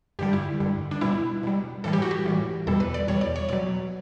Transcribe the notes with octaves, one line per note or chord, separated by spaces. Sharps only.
G2 D3 G3 G4
E4
G2 D3 G3
D4
B2 G3 E4
B2 G3
A2 E3 G3 A4
G4
F#4
G4
A2 E3 G3
E2 B2 G3 A4
B4
D5
E2 B2 G3 C#5
D5
C#5
B2 F#3 D5